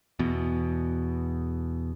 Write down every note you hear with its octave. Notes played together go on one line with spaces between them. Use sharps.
E2 B2